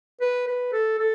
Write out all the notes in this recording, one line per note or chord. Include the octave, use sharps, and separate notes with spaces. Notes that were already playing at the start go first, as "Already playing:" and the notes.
B4
B4
A4
A4